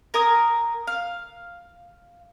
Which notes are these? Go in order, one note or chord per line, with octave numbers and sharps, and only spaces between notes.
A#4 G#5 D#6
F5